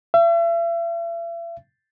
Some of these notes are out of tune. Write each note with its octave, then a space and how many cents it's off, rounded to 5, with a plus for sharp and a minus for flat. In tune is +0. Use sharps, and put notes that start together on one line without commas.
E5 +40